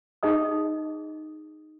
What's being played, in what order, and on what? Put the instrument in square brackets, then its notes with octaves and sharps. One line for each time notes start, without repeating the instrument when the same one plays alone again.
[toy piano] D#4 G#4 D#5 D#6